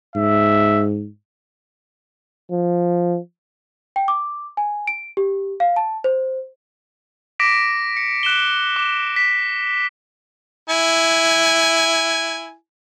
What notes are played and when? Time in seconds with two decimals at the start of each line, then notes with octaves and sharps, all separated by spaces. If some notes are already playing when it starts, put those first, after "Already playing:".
0.16 G#2 E5
2.51 F3
3.96 G5
4.08 D6
4.57 G#5
4.87 D7
5.17 G4
5.60 F5
5.76 A5
6.04 C5
7.39 D6 A#6 B6 D7
7.97 C#7
8.23 F#6 E7 G7
8.76 D6
9.16 B6
10.70 E4 G#5